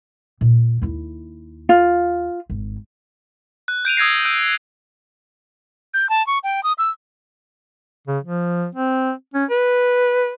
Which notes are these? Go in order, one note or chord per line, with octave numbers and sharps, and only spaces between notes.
A#2
D#2 E4
F4
G#1
F#6
G6 D7 D#7 F7
D#6 E6 G#6 A#6 C7
E6 G6 D7 D#7
G6
A5
C#6
G5
D#6
E6
C#3
F3
C4
C#4
B4